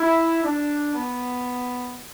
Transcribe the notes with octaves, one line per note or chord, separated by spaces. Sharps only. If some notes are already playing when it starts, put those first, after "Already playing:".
Already playing: E4
D4
B3